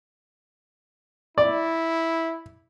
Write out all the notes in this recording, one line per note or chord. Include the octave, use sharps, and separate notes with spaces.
E4 D5